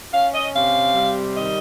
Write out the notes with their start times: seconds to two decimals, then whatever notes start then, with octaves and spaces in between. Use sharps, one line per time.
0.13 C#4 F5
0.34 D#5
0.54 C3 F5
0.95 G3
1.36 D#3 D#5